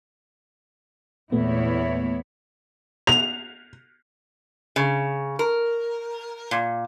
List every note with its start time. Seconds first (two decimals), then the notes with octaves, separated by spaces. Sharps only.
1.32 E2 A#2 A3 B3 E4 C#5
3.07 F7
4.76 C#3
5.39 A#4
6.51 A#2